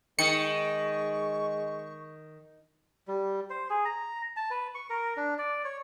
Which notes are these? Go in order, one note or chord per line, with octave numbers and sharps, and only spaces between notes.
D#3 G#3 C#6 C#7
G3
C5
G#4
A#5
A5
B4
C#6
A#4
D4
D5
C#5